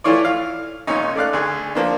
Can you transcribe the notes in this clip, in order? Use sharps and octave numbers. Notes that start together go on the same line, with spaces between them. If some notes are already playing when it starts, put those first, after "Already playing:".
E3 A3 E4 F4 C#5 D5
F5
G#1 A#2 C#4 D#4
A3 D5 F5 F#6
D2 G#4
F3 A#3 D4